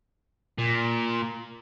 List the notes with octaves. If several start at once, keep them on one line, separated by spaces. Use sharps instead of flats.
A#2